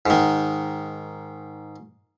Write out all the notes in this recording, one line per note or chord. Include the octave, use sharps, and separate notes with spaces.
G#2 D#3